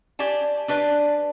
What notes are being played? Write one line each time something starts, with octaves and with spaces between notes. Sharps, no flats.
G4 D5 G#5 A5
D4 G4 B4 D5